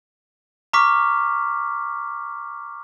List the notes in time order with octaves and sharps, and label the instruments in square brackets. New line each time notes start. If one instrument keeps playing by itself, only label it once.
[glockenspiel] A#5 C#6 D6 F6 B6